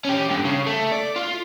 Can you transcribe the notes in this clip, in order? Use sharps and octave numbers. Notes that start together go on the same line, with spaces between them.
C#4 G4
G2 D3
C#3
A3
D5
F4